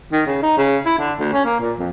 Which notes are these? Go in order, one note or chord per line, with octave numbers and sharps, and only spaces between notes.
D#3
C#3
D#4
C#3
E4
D3
D2
C#4
A#3
A#2
F2